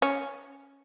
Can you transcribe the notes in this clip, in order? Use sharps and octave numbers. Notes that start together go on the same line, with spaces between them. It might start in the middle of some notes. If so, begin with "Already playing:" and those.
C#4